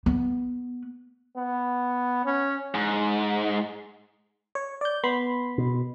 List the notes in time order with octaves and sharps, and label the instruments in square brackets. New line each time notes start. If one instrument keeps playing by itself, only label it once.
[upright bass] B3
[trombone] B3
C#4
[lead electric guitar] G#2
[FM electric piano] C#5
D5 G6
B3 B5 C6
[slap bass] B2